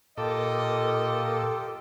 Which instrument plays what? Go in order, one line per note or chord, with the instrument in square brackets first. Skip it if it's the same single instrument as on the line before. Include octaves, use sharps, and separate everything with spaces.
[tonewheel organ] A#2 A#4 D6 [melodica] F4 G4 [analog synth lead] A4 [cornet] D#5